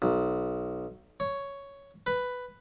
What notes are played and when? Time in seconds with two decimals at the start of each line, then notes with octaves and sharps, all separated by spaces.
0.02 B1
1.20 C#5
2.06 B4